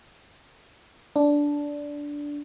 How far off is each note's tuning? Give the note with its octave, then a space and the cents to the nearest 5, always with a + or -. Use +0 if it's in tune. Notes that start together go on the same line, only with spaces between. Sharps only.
D4 -10